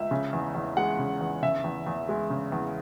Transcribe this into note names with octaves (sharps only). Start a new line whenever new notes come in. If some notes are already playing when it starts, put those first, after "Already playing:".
Already playing: C#2 E5
C#3
E2
E2
G#3 F#5
C#3
E2
C#3 E5
E2
E2
G#3
C#3
E2